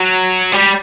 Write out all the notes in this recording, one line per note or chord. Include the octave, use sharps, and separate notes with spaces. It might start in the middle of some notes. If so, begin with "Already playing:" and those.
Already playing: F#3
G3